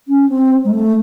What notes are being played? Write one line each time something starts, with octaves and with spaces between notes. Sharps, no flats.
C#4
C4
G#3
A3